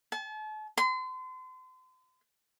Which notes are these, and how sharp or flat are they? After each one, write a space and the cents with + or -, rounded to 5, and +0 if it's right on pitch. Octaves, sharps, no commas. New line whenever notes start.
A5 -40
C6 -35